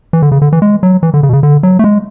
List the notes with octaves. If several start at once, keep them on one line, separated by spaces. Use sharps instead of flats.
E3
D3
C#3
D3
E3
G#3
F#3
E3
D3
C#3
B2
C#3
D3
F#3
A3
G#3